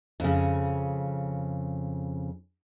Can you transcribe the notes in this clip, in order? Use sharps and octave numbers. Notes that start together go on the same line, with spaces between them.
F2 C#3